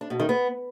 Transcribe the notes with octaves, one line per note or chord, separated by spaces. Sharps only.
D4
B2
D#3
B3